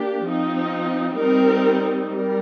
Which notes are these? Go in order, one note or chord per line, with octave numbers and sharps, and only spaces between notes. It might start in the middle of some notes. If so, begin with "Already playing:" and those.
Already playing: A#3 D4 G4
F3 C4 D#4
G3 C4 D#4 A#4
G3 A#4